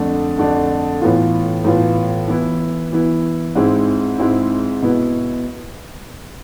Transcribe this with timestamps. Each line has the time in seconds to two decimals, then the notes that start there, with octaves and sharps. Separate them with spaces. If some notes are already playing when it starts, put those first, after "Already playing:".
Already playing: F2 D3 A3 D4
0.37 F2 D3 A3 D4
1.01 A2 E3 B3 F4
1.64 A2 E3 B3 F4
2.28 E3 B3 E4
2.92 E3 B3 E4
3.55 G#2 G#3 C4 E4
4.18 G#2 G#3 C4 E4
4.82 B2 B3 E4